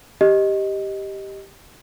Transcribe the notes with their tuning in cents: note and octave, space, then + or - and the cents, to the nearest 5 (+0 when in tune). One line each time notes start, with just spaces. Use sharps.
G4 +0 D#5 +0